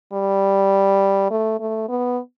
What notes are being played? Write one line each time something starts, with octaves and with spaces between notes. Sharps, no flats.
G3
A3
A3
B3